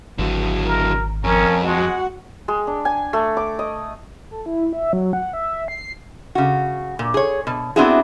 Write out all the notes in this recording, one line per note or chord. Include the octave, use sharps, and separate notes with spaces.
G#1 D3 F#3
A#4
F2 C#4 A#4
G#3 F#4 F#5
G#3
D4
G#5
A3
D6
D#5
A4
E4
E5
F#3
F#5
E5
C7
C#3 F#4
A#2
G#4 C#5
B2
B3 C4 D4 E4 F#4 G#4